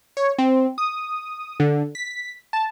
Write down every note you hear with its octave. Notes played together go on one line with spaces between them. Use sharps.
C#5
C4
D#6
D3
B6
A5